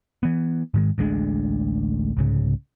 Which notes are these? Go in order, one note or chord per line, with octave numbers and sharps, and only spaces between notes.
E3 B3
G#2 D#3 G#3
A1 D2 G#3 D4
C2 G#2 C#3